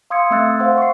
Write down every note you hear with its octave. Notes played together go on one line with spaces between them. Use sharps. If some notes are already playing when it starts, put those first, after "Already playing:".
F5 C6 D#6 E6 G#6 C#7
A3 C4 E5 E6 F#6 A6
C5 F5 F#5 C6
C#6 C7